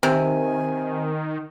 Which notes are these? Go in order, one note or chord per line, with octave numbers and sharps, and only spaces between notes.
C3 D#3 C4 G#5